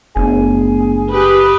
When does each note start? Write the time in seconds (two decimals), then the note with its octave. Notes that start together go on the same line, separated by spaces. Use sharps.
0.16 F#1 A3 B3 D4 G#4
1.12 G4 B4 D#6